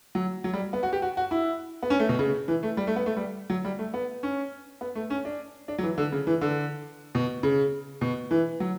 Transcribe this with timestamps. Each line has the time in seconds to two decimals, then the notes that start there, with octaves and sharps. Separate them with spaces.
0.15 F#3
0.44 F#3
0.53 G3
0.73 B3
0.83 F#4
0.93 G4
1.02 F#4
1.17 F#4
1.31 E4
1.83 B3
1.90 C#4
1.99 A3
2.09 B2
2.19 C#3
2.48 E3
2.63 A3
2.77 G3
2.87 A3
2.96 B3
3.06 A3
3.17 G3
3.50 F#3
3.65 G3
3.79 A3
3.94 B3
4.23 C#4
4.81 B3
4.95 A3
5.10 C#4
5.25 D4
5.68 D4
5.78 F#3
5.83 E3
5.98 D3
6.12 C#3
6.27 E3
6.41 D3
7.15 B2
7.43 C#3
8.01 B2
8.31 E3
8.60 F#3